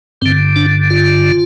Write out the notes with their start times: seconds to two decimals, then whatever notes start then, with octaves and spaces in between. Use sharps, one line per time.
0.22 G2 D3 C4
0.56 D4
0.90 F4